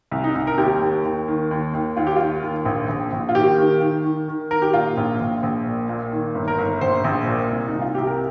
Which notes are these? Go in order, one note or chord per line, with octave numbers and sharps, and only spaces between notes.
C2
D#4
C2
A#4
D#2 G4
D#2
D#2
D#3
D#2
D#2
D#2 F4
G4
D#3 F4
D#2
A#1
A#1
A#1
F4
D#3 G4
D#3
D#3
D#3
D#3
D#3 A#4
G4
A#2 F4
A#1
A#1
A#1
A#2
A#2
D#3
G1
A#4
G1
A#1 C5
A#1
A#2
C2
D#4
C2
F4
C2 G4
A#4